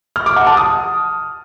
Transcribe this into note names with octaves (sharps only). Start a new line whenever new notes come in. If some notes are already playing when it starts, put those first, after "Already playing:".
F6
D6
F#5
A5
D#6